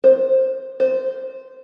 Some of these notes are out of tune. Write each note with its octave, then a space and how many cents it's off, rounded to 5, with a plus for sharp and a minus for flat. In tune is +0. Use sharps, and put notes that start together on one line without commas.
C5 +10
C5 -10